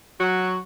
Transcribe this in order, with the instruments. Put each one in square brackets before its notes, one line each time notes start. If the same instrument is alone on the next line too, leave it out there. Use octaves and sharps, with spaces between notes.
[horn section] F#3 F#4